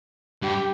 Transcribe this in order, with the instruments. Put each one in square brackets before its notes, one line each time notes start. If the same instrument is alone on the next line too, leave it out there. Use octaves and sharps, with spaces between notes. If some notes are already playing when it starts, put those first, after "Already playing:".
[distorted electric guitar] G2 [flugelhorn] G4